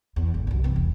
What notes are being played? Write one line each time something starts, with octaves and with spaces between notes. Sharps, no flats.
E2
G#1 D3
C2 F#2
E3 C4
E1